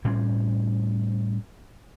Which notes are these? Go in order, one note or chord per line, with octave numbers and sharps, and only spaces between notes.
A2 G3 C4 C#4